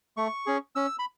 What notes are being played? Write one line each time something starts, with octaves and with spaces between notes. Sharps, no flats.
A3 C#6
C#4 G#4
C#4 E6
B5